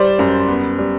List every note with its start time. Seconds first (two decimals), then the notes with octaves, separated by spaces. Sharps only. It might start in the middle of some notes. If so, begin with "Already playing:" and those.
Already playing: G3 C5 D5
0.19 F#2
0.48 B3
0.79 G3